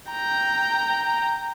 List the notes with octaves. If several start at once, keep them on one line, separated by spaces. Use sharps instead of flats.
G5 A#5